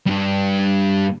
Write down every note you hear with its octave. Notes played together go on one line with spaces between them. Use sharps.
G2 G3